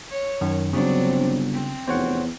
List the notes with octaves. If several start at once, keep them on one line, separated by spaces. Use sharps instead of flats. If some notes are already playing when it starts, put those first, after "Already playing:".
C#5
F#2 D#3
G1 C#3 F#3 C4 D4
C4
F1 E2 C5 C#5 F#5